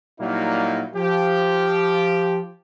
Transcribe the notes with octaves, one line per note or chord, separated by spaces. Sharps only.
A#2 F#3 G3 A#3 D#4 E4
F3 G4